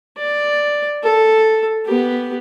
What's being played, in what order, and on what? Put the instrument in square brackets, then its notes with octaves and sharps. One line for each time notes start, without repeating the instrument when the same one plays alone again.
[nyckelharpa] D5
A4
B3 G4